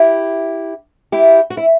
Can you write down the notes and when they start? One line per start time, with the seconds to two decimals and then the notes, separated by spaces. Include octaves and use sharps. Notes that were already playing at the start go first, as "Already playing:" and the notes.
Already playing: E4 G4
1.12 E4 G4
1.50 F#4
1.57 E4